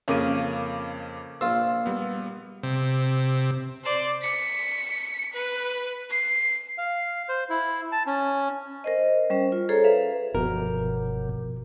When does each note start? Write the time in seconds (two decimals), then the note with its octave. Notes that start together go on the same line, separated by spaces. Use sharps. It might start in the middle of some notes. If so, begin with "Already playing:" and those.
0.08 F2 C#3 A#3 D6 D#7
1.41 A#1 F4 C5 E6
1.86 G3 B3
2.63 C3
3.84 C5 D5
4.22 B6 C#7
5.33 B4
6.10 C7
6.78 F5
7.29 C5
7.50 E4
7.92 A5
8.07 C#4
8.84 A#4 C5 D#5
9.30 G3 C#4 C5
9.52 F4
9.69 G#4 A4 C5 C#5 A#5
9.84 B4 E5 F5
10.35 F#1 G2 B2 F3 A#4